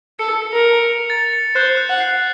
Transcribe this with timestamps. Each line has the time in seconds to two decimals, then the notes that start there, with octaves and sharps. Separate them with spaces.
0.19 A4 C#7
0.42 C#7
0.53 A#4
0.65 C#7
0.87 F7
1.10 A6
1.33 C#7
1.55 C5 F#6
1.77 F#6
1.90 F#5
2.00 C7